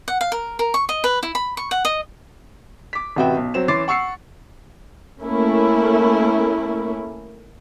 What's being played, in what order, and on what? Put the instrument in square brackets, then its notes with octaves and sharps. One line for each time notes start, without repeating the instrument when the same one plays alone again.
[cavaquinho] F#5
F5
A#4
A#4
C#6
D#5
B4
E4
B5
C#6
F#5
D#5
[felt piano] D6 B6
A1 C3 F#4 B4 E5 G5
B1
F#3 C4 E7
E3 C#4 C6 D6 A6 C7
F#5 C#6 E6 C7 C#7
[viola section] A3 A#3 C#4 E4